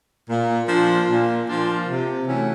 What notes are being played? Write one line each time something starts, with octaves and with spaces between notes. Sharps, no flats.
A#2
F3 A#3 D4 F4
A#2
F3 A#3 D4 F4
C3
E3 A3 C#4 F#4